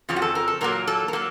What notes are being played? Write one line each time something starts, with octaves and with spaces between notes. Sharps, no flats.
F2 C#3 F3 F4
F#4
A4
A#4
A4
A#2 F#3 A#3 A#4
A4
A#4
F#3 A#3 A4